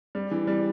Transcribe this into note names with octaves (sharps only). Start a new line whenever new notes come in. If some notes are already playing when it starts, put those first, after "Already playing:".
G3
E3
G3